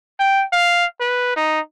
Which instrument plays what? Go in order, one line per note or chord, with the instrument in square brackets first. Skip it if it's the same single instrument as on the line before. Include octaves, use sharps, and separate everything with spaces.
[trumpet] G5
F5
B4
D#4